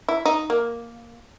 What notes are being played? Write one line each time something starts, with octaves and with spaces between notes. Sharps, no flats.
E4
D#4
A#3